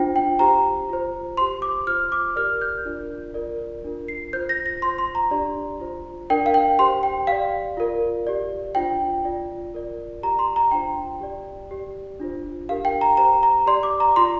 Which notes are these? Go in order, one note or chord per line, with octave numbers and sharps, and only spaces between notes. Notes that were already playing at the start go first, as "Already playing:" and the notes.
Already playing: D4 F4 C5 G5
G5
G4 C5 A#5
F4 C5
G4 C5 C6
D6
F4 C5 F6
D6
G4 A#4 D5 F6
G6
D4 F4 A#4 D5
F4 A#4 D5
D4 F4 A#4
C7
F4 C5 G6
A#6
A#6
F4 C5 C6
C6
A#5
D4 G4 D5
F4 C5
D4 A#4 D5 G5
F5
G5
G4 C5 C6
G5
G4 D5 F5
F4 A#4 D5
G4 D5
D4 F4 C5 G5
F4 D5
F4 A#4 D5
G4 D5 A#5
C6
A#5
D4 F4 C5 G5
G4 D5
G4 D5
D4 F4 C5
D4 G4 A#4 F5
G5
A#5
G4 C5 A#5
A#5
G4 D5 C6
D6
A#5
F4 D5 C6